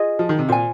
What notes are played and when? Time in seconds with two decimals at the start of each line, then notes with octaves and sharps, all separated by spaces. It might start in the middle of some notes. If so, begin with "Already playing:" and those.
Already playing: F4 G#4 D#5
0.19 F3
0.29 D#3
0.39 C3
0.48 A#2 F4 C5 G#5